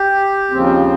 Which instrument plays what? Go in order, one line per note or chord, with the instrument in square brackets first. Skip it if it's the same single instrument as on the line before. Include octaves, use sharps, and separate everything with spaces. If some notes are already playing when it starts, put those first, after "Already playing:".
Already playing: [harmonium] G4
D#2 C#3 F3 C4